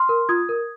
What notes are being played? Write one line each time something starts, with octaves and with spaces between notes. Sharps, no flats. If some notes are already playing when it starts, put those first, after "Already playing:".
Already playing: C6 F6
A#4
F4 D#6 G#6
A#4